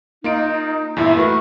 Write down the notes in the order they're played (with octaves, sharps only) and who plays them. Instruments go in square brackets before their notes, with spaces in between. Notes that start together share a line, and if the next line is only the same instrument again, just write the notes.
[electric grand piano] A#3 F4 D7 [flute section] D#4
[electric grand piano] E2 G2 A#2 [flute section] E4
[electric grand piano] A3 F#4 A#4 [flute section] B4 C#6